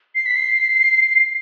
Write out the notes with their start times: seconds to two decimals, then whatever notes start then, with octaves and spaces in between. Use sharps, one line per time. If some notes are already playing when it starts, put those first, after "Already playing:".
0.15 C7
0.26 B6
0.36 C7